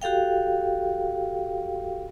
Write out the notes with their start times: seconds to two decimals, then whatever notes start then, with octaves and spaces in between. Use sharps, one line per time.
0.02 F#4 G4 A4 F5 G5